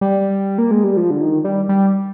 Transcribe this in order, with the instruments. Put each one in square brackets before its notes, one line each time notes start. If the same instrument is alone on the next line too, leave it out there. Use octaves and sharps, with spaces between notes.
[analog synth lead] G3
A#3
G#3
G3
F3
D3
D#3
G3
G3